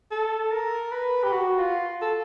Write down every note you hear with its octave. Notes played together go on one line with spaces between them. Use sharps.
A4
A#4
B4
G4
F#4
F4
A4